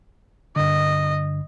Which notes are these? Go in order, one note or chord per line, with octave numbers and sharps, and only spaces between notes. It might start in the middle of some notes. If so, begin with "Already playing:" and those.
G2 D3 D#5